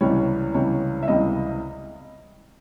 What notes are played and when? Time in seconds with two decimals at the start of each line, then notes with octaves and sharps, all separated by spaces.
0.01 C#2 C3 E3 G3 C#5
0.54 C#2 C3 E3 G3 C#5
1.03 E5
1.08 C#2 C3 E3 G3 D#5